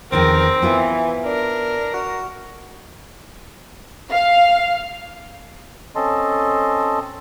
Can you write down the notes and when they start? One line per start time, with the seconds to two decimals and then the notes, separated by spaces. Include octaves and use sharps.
0.12 E2 D#3 F3 C4 A#4
0.62 E3 B3 F4 B4
1.25 D4 A#4
1.94 F#4
4.11 F5
5.96 C4 C#4 A4 D#5 A5 C6